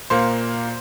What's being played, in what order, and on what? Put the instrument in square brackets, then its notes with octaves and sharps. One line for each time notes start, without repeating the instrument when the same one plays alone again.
[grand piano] A#2 A#3 C5